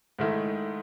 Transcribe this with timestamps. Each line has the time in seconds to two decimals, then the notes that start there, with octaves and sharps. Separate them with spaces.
0.19 G#2 D#3 A3 E4